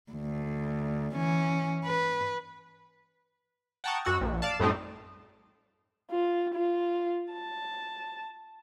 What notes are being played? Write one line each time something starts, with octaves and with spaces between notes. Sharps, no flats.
D2
E3 C#4
B4
F#5 G5 A5 A#5 C#6 D#6
F#2 F#4 F#5 E6
A#1
D5 F5 A5
F#2 A2 G3 A3 C4 D#4
F4
F4
A5